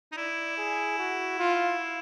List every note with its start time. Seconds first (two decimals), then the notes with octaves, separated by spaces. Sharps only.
0.12 D#4
0.16 E4 D5
0.58 G#4
0.98 F#4
1.39 F4